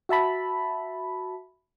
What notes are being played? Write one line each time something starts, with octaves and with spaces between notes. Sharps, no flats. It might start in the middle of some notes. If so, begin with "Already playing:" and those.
F#4 E5 A5 B5